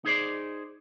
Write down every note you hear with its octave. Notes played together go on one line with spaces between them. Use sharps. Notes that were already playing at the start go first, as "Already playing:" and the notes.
D#4 G#4 C5 D5